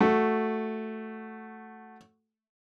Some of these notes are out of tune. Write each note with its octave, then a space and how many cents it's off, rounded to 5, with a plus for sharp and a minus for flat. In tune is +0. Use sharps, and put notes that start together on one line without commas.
A3 +0 F#4 +0